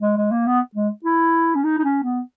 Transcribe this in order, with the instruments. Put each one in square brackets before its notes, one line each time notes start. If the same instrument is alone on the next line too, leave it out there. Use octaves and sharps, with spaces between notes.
[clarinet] G#3
G#3
A#3
B3
G#3
E4
C#4
D#4
D#4
C#4
B3